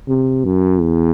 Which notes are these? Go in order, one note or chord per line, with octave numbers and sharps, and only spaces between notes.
C3
F#2
E2